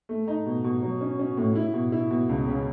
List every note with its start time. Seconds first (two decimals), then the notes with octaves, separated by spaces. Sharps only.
0.09 A3
0.28 D#4
0.46 B2
0.64 B2
0.83 F#3
1.01 C#4
1.19 C#4
1.37 A2
1.55 E4
1.74 B2
1.92 E4
2.11 B2
2.29 C#2
2.47 C#3